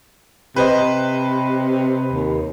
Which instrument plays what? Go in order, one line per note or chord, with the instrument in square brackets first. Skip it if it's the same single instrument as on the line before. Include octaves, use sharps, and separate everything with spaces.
[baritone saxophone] C3 [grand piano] B4 C5 D#5
[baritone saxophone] D#2